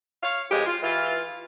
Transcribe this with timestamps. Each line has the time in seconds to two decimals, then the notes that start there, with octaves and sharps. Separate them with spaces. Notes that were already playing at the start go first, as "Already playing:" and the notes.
0.23 C#5 F5
0.50 F2 A2 G#3 G4
0.66 F4
0.82 E3 F4